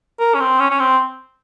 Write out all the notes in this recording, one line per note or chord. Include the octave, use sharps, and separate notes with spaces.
A#4
C#4
C4
C#4
C#4
C4